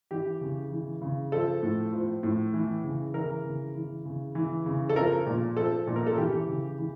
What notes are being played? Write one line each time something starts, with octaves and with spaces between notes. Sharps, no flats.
E3 G4
C#3
E3
C#3
F3 A4
A2
F3
A2
E3
C#3
E3 A#4
C#3
E3
C#3
E3
C#3
A4
F3 A#4
A#2
F3 A4
A#2
A#4
A4
E3 G4
C#3
E3